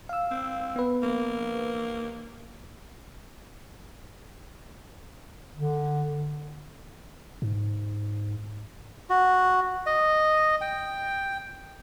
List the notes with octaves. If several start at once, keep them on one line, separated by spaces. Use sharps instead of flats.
F5 E6
C4
B3 B4
A#3
D3
G#2
F#4
D#5
G5